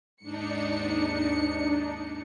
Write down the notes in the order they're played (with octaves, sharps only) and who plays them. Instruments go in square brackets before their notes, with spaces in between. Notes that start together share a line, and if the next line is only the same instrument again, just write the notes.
[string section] D#2 G#2 C#7 [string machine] D4 D#4